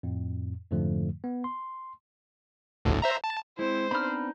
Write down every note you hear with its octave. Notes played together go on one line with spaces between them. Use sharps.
F2 A2
F2 G#2 D3 F3 A3
B3
C6
G1 D2 A2
C5 E5 A#5
A5
G#3 C4 E4 C5
B3 C4 D4 D#4 B5 F6